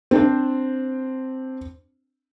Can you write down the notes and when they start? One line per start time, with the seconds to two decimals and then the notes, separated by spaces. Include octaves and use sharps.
0.11 C4 D4 C5